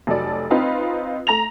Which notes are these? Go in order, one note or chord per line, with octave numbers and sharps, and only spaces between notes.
F1 F#3 A4 D5
C4 D#4 F4 B4 F5 B5
A3 A#5 A#6 F7